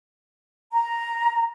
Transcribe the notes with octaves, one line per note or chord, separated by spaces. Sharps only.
A#5